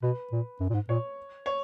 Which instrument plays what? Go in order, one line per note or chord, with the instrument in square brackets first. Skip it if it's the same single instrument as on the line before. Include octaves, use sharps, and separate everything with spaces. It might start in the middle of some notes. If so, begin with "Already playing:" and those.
[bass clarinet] B2 [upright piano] B4
[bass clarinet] A#2
F#2
A#2
G#2
[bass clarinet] A#2 [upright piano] C#5
[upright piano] C#5